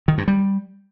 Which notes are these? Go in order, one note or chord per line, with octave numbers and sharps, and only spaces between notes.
D#3
G2
G3